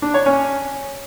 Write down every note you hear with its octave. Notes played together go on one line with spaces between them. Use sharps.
D4
C#5
C#4